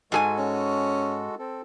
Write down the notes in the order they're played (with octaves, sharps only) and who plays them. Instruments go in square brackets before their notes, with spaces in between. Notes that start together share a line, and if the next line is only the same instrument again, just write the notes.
[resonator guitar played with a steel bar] G#2 G#4 G#5 [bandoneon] G#3 F#4 A4
[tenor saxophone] C#4
[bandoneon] C4 A4